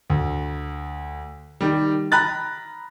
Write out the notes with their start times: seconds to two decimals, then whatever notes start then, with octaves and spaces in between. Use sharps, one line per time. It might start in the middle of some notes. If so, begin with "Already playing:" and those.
0.10 D2
1.61 D#3 G3
2.12 A#5 B5 F#6 A6